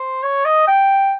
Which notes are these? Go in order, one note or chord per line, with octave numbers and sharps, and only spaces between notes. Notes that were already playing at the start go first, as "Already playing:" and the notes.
Already playing: C5
C#5
D#5
G5